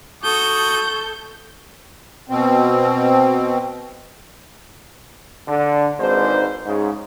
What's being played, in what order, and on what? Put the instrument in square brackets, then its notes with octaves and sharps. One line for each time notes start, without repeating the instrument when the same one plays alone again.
[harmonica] F#4 D#6 [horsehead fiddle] A4 [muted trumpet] C#6 [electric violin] G6
[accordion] B2 C4
[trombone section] D3 D4
G#1 G#2 D4 B4 C5
G#2 C#3